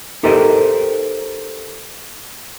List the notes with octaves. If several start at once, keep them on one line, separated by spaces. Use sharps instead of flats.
D#4 G4 A4 A#4 C5 D#5